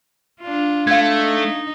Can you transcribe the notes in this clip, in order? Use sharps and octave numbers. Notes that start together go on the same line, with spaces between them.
D4 F4
A3 F5 G#6
D#4